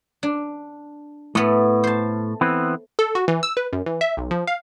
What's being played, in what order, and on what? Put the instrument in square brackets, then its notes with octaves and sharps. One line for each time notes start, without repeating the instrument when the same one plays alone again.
[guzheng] D4
[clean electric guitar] A2 [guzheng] A3 B3
[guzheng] C5 A5
[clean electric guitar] E3 B3 C4
[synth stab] A4
F#4
E3
E6
B4
F#2
E3
E5
B1
F3
F5